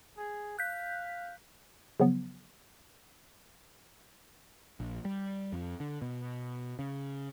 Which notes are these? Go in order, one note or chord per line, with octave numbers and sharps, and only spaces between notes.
G#4
F5 F#6 G6 B6
C#3 F3 F#3 B3
A#1
G3
F2
D3
B2
C#3